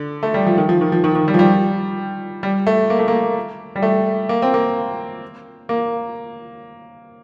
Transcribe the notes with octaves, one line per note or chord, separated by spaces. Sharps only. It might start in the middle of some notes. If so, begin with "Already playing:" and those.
Already playing: D3
A3
G3
F3
D#3
F3
D#3
F3
D#3
D#3
G3
F3
G3
G3
A3
A#3
A3
A#3
G3
A3
A#3
C4
A#3
A#3